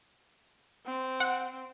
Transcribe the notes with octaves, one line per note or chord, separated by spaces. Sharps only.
C4
F#5